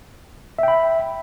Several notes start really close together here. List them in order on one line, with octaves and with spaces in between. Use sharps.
E5 G5 B5